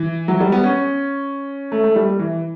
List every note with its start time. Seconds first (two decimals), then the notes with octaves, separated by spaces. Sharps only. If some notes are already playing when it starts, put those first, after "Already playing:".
Already playing: E3
0.28 F#3
0.40 G3
0.52 B3
0.64 C#4
1.72 A3
1.84 A3
1.96 G3
2.19 E3